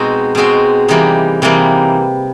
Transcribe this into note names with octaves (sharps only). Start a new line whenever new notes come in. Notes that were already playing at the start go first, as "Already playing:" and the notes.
Already playing: B2 G#3 C4 D#4 F#4
B2 G#3 C4 D#4 F#4
C3 E3 G3 A#3 D#4
C3 E3 G3 A#3 D#4